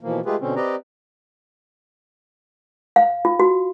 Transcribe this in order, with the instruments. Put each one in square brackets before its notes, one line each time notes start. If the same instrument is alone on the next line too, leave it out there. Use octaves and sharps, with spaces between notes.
[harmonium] B2 E3 F3 A#3
G#3 A3 F4 G4 G#4 B4
B2 D3 C4 C#4
C4 G4 B4 D5 D#5 A#5
[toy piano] F5
F4
F#4